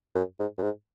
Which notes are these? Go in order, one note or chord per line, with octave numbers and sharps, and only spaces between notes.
F#2
G#2
F#2
G#2